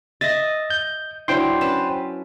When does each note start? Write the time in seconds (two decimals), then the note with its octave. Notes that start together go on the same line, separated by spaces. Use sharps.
0.21 D#5 E5 A6 A#6
0.70 G6
1.28 F#3 D4 E4 C5 G5 C6
1.61 C#4 B4 A5